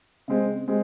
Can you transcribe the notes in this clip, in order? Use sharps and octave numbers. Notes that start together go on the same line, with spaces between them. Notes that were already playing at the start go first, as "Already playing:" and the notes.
C#3 G#3 C4
G#3 C4